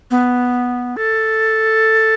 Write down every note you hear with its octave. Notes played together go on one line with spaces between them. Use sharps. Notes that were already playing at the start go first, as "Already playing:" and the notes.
B3
A4